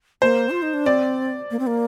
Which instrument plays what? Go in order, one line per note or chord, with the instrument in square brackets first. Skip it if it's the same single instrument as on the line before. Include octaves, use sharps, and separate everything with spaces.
[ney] A#3 [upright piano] C5
[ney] F4
D#4
D4
[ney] C4 [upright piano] D5
[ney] A#3
C4
A#3